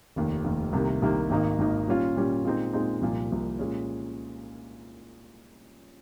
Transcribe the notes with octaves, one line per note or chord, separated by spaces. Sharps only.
F1 D#2 D#3
F1 D#2 D#3
C2 C3 D#3 A#3
C2 C3 D#3 A#3
G#1 G#2 D#3 A#3 D#4
G#1 G#2 D#3 A#3 D#4
A#2 G3 C#4 F4
A#2 G3 C#4 F4
A#2 G#3 C4 D#4
A#2 G#3 C4 D#4
C2 A#2 F3
C2 A#2 F3
A#2 G#3 C#4